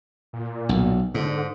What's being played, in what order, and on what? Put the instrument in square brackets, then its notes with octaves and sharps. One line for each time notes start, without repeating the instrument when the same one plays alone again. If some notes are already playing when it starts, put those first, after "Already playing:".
[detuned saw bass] A#2
[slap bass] B1
[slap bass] G#2 [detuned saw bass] D3